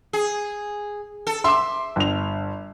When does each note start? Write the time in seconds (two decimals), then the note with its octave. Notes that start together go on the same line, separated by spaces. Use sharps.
0.13 G#4
1.27 A4
1.44 E5 C6 D6
1.96 G1 F7